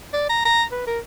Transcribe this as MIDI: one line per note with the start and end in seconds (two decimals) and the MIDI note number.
0.13 0.26 74
0.29 0.41 82
0.45 0.64 82
0.72 0.83 71
0.87 0.99 70